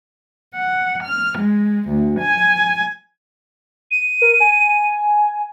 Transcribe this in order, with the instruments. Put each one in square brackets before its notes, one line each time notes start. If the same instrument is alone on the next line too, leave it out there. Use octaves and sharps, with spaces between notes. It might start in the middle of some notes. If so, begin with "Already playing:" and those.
[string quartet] F#5
F6
G#3
D2
G#5
[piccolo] D#7
[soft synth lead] A#4
G#5